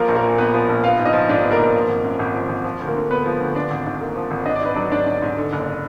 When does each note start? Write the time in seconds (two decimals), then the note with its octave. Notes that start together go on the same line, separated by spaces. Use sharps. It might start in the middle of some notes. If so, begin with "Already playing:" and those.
Already playing: F3 A#3 A#4
0.08 A#1
0.15 A#3 A#4
0.24 A#2
0.38 A#1 B3 B4
0.54 F3
0.69 A#1
0.84 B3 F4 F5
0.99 G#2
1.05 D#4 D#5
1.13 F3
1.29 G#2 D4 D5
1.43 B3
1.51 A#3 A#4
1.59 G#2
1.74 F3
1.89 G#1
2.04 F#2
2.19 G#1
2.34 F3
2.49 G#1
2.64 F3
2.80 D2
2.87 A#3 A#4
2.95 D3
3.11 B3 B4
3.26 F3
3.40 D2
3.55 F3 D4 D5
3.71 G#1
3.86 G#2
4.01 A#3
4.16 F3
4.31 G#1
4.46 D4 D#5
4.56 D5
4.61 G#2 B4
4.74 F#3 D4 D5
4.92 G#2 D4 D5
5.06 D4
5.22 G#2
5.37 D3
5.53 F#1